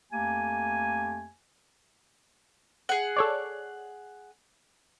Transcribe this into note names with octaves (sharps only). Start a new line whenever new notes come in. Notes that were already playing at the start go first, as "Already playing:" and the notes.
F2 A3 A#3 G4 G#5
G#4 F#5
A4 C#5 D5